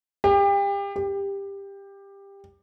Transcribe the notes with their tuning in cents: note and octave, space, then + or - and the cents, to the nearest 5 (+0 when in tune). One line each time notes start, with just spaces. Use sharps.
G4 +30
G4 +15